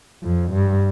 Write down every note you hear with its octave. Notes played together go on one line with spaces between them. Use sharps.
F2
G2